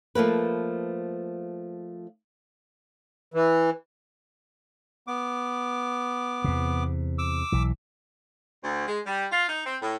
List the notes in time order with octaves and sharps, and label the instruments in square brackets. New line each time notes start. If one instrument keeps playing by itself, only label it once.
[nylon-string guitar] F3 A3 A#3 B4
[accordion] E3
[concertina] B3 D6
[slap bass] E2 C3
[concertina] D6 E6
[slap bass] B1 E3
[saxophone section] D2
G#3
G3
F4
D#4
C4
A2